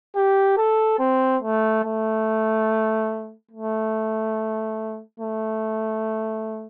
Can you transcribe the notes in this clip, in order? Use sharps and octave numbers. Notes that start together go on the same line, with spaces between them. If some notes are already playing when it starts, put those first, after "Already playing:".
G4
A4
C4
A3
A3
A3
A3